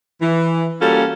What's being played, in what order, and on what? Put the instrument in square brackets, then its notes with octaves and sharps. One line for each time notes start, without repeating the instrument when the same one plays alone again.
[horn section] E3
G3 A#3 C#4 F4 F#4 A4